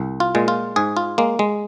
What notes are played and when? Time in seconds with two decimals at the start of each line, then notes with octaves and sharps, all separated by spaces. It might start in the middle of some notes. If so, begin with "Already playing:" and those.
Already playing: C2
0.20 F4
0.35 A#2 G#3
0.48 F4
0.76 G#2 G#4
0.97 F4
1.18 G#3 A#3
1.39 G#3